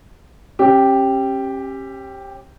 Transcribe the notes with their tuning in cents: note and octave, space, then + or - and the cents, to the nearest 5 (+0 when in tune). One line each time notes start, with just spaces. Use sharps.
C#4 -40 G4 +0